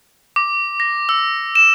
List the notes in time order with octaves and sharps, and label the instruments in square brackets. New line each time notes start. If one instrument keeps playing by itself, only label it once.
[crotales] D6
A#6
E6
E7